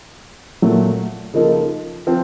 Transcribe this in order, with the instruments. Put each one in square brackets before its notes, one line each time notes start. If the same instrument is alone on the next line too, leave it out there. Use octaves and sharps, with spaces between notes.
[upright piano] A#2 F#3 A3
C#3 F3 A#3 D#4 A4
F3 C4